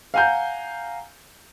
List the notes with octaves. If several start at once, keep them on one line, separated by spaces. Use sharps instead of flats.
F5 F#5 G#5 A#5 G6